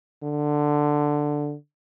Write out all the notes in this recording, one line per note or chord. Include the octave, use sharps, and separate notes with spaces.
D3